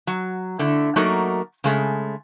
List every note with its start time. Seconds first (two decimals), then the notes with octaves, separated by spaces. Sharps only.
0.07 F#3
0.59 D3 A3 E4
0.96 F#3 A3 A#3 D#4 F#4 A#4
1.64 C#3 G#3 A3